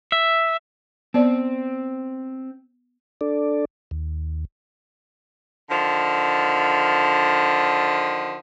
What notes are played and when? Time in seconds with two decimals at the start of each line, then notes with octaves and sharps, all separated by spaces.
0.12 E5
1.14 B3 C4 D5
3.21 D4 A4 D5
3.91 D#2
5.69 D3 D#3 F3